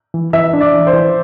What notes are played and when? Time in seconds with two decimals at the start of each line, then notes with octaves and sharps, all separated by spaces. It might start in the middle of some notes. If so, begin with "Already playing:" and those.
0.14 E3
0.33 E3 E5
0.53 D4
0.61 D5
0.74 E3
0.87 C5
0.93 E3